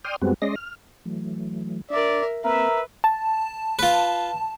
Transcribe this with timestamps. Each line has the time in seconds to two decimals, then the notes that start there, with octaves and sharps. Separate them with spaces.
0.05 D5 G5 C6 D#6 F6
0.22 F#2 G3 G#3 B3 C4 F#4
0.42 G#3 C#4 D5 D#5 C6 A#6
0.56 F6
1.05 E3 F#3 A3
1.90 D4 A#4 D5 E5
2.44 A#3 C4 A#4 B4 E5
3.04 A5
3.79 F4 B4